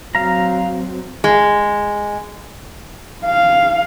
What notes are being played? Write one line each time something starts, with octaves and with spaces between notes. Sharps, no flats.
F#3 C4 F5 A#5
G#3
F5